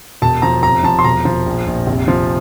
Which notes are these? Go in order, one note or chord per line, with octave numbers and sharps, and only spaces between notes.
E1 A5
F3 A#5
F1 A#5
F3 A5
C6
E1 A#5
F3
A#1
A#1
F1
F3